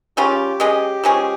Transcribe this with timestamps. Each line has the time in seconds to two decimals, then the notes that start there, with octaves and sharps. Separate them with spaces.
0.17 C#3 G3 C#4 F4 G4
0.60 G#3 C#4 G#4 D#5
1.03 F3 G#3 C#4 G#4